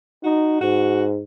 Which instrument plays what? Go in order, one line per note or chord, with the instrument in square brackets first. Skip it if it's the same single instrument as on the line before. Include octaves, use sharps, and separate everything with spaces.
[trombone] D#4 [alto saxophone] F#4
[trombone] G#2 [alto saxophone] F#4